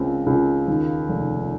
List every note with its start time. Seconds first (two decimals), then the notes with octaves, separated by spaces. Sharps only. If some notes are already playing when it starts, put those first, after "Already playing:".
Already playing: C#2 C4
0.26 C#2
0.68 D#2
1.09 F1